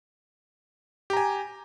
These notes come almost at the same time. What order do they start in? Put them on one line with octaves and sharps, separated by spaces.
G4 A#5 G#5